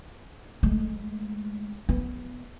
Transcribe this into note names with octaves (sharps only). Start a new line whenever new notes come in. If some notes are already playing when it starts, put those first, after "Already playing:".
G#3 A3
B3